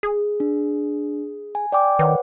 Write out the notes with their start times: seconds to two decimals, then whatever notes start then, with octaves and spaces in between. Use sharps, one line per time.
0.03 G#4
0.40 D4
1.55 G#5
1.72 D5 G5 D6
1.99 D#3 B4 C#5 F#5